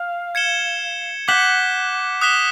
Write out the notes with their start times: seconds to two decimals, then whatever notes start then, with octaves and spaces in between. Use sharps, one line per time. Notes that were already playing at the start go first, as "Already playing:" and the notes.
Already playing: F5
0.35 G#6 C#7 E7 G7
1.28 F#5 D6 G6 B6 E7 G7
2.21 D#6 F#6 B6 E7 G7